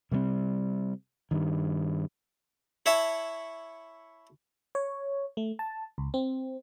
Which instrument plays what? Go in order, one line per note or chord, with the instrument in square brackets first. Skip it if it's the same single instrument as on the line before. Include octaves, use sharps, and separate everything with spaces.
[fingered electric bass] C3 G3 A3 C4
G2 D#3
[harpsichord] E4 C#5 E5 A5 B5
[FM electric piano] C#5
A3
A5
C#2
C4